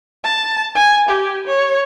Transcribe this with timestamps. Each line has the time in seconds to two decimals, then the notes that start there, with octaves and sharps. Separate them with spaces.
0.24 A5
0.75 G#5
1.09 G4
1.47 C#5